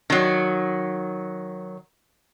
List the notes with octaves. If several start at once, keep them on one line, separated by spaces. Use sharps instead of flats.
D#3 F#3